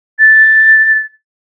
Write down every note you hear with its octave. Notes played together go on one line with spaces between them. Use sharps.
A6